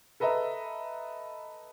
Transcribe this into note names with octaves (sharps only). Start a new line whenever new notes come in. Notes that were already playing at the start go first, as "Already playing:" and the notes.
A4 B4 D#5 E5 A#5